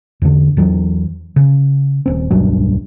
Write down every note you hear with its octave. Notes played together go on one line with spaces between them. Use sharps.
E2 D3
E2 E3 F#3
C#3
D#1 C4
D1 B1 G2 F#3